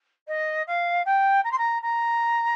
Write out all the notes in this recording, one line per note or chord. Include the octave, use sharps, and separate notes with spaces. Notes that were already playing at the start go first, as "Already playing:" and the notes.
D#5
F5
G5
A#5
C6
A#5
A#5